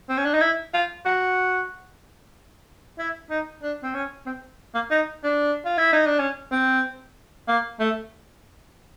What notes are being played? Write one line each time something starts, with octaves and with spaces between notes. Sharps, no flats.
C4
C#4
D4
D#4
E4
F4
F#4
E4
D#4
D4
C4
C#4
C4
A#3
D#4
D4
F4
E4
D#4
D4
C#4
C4
A#3
A3